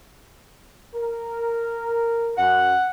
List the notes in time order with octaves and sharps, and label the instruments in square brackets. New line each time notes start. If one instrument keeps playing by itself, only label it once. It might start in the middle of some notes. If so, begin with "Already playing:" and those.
[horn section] A#4
[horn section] F#2 [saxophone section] F#5